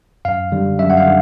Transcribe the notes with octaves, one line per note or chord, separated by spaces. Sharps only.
F#2 F5
D3 G3
F#2 E5
F#5
F5
D3